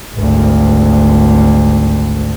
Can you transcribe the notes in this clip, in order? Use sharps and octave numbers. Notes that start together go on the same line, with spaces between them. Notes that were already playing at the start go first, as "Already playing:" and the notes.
G#1 D2